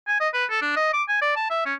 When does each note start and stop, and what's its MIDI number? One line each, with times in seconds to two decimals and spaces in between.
0.08 0.20 80
0.20 0.28 75
0.33 0.45 71
0.50 0.61 69
0.62 0.74 62
0.76 0.91 75
0.93 1.03 86
1.08 1.17 80
1.22 1.35 74
1.36 1.50 81
1.50 1.66 76
1.66 1.74 61